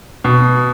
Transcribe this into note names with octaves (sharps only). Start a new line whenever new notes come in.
B2